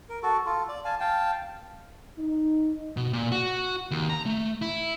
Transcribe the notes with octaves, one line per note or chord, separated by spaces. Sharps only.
A#4
F#4 A4
F4 A4
D5
F5 G#5 A5
F5 G5 A5
D#4
B2
A#2
F#4
D#2
A#5
A3
E4